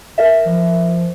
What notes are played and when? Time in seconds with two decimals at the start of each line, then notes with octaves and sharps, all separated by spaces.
0.18 A#4 E5
0.45 F3